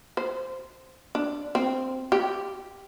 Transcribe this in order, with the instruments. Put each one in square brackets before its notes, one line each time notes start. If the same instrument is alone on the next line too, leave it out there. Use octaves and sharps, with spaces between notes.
[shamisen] C5
D4
C4
G4